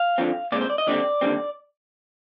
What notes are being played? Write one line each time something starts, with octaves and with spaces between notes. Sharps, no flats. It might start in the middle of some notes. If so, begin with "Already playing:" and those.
Already playing: F5
F2 D3 F3 C4
A#2 G#3 C4 D5
C5
D5
D#5
D#2 D3 G3 C4 D5
D#2 D3 G3 C4